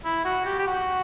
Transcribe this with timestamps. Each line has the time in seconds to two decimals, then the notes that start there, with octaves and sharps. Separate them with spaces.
0.05 E4
0.25 F#4
0.46 G4
0.59 G4
0.67 F#4